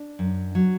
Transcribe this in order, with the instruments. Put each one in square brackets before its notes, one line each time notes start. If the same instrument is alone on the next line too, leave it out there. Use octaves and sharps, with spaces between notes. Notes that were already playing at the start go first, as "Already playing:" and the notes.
Already playing: [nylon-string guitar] D4
F#2
F#3